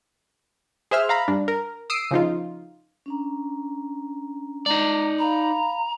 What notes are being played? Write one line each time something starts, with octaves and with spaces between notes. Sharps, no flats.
G#4 C5 E5 F6
F5 A#5 B5
G2 D4
A#4
D#6 E6 C7 D7
C#3 F3 D#4 F4
C#4 D4 A#5
G#3 D#4 D5 A#5
F5 A#5 B5